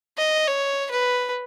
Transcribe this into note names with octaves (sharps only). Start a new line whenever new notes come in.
D#5
C#5
B4